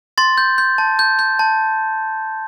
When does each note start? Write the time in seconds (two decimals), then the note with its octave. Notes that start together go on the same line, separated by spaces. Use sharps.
0.18 C6 A6
0.38 G6
0.58 G6
0.78 A5
0.99 G6
1.19 G6
1.39 A5